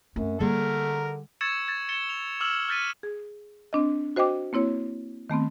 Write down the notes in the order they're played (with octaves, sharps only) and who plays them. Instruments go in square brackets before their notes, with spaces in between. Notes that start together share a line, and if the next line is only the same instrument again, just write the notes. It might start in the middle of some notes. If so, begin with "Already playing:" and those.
[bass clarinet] F#2 [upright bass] A3 C4
[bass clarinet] D3 [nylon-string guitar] G3 G#4 [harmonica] A3 A#4 [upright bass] A#3
[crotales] C#6 E6 G#6 A6 C#7 E7
G#6 A6
A6 C#7 E7 G7
F7
D6 E6 F6 E7 F#7
F6 F#6 A6 B6 C#7 D#7
[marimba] G#4
C4 D4 D#5
F#4 C5 D#5 G5 D6
A#3 C4 E4 C#5
D#3 A3 B3 C4